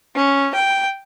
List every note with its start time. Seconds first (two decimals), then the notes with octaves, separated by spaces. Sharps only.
0.16 C#4
0.55 G5